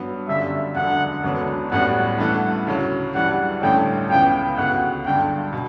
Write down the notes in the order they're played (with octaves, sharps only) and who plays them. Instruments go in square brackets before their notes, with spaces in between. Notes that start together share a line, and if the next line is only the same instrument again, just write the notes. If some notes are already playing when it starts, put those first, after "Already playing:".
Already playing: [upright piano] G2 F#3 B3
[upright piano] G1 F#2 D3 G3 [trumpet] E5
[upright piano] E1 D2 D3 [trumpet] F#5
[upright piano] E1 D2 D3 F#3 B3
[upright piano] A1 A2 G3 B3 F#4 [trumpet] F#5
[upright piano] G2 E3 A3 [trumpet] F#5
[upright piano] D2 C#3 F#3
[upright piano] G2 E3 G3 [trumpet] F#5
[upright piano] A1 G2 D3 A3 C#4 [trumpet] G5
[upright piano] C#2 C#3 E3 B3 [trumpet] G5
[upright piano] D2 C#3 F#3 B3 [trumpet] F#5
[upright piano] G1 G2 D3 [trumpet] G5
[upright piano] B2